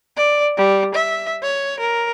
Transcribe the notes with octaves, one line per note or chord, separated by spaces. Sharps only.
D5
G3
E5
C#5
A#4